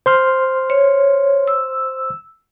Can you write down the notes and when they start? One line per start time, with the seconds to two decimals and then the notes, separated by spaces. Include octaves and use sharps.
0.06 C5 C6 F6
0.70 C#5
1.48 E6